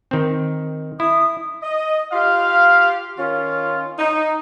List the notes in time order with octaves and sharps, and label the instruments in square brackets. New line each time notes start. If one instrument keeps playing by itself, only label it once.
[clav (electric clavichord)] D#3 C4
[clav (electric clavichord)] E4 [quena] D#6
[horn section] D#5
F4 G4 F5
D#3 C#4 F4
D#4